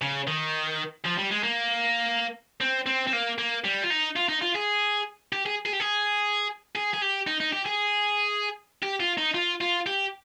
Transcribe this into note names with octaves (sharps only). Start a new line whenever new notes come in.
C#3
D#3
F3
G3
G#3
A#3
C4
C4
C4
A#3
A#3
G3
F4
D#4
F4
D#4
F4
G#4
G4
G#4
G#4
G4
G#4
G#4
G#4
G4
D#4
D#4
G4
G#4
G4
F4
D#4
F4
F4
G4